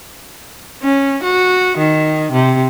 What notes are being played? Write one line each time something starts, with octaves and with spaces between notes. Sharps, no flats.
C#4
F#4
D#3
C3